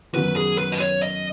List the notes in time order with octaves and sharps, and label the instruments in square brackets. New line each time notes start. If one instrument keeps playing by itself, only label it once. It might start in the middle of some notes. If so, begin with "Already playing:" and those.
[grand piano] F#2 D#3 B3 D#4 F#4 [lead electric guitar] B4
[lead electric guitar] G#4
B4
D#5
C#5
D#5